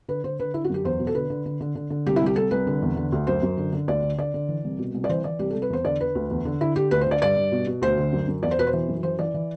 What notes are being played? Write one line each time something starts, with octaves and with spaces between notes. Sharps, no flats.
D3 B4
D3 C5
D3 B4
D3 E4
F#4
F#2 G4
E2 C5
B2
A4
D3 B4
D3
D3
D3
D3
D3
C2 G4
E4
C2 G4
C2 A4
C2 B4
D3
E2
D3
D2
F#2 C5
F#2
D3
D3
D2 D5
D3
D3 D5
D3
E3
C2
B2
C2
D5
E3 C5
E3 D5
C2 G4
C2 A4
B4
E2 C5
D3 D5
D3 B4
D2
E2
D3
D3 E4
D3 G4
D2 B4
C5
D3 D5
G2 D5
G2
B2
B2
D2 C5
D3
F#2
F#2
E2 D5
C5
B2 B4
C5
E3
F#2
E3 C5
E3 D5
E3